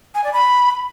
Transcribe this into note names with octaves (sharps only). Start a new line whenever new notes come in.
G#5
D5
B5